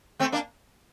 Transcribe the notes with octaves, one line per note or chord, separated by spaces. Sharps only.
A3 C4
A#3 D4